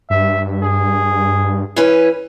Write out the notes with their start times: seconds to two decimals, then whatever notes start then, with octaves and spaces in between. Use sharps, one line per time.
0.10 G2 E5
0.62 G#4
1.76 E3 C#4 B4